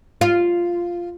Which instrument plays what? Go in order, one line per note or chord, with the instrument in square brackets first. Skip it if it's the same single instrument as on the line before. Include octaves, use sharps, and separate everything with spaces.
[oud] F4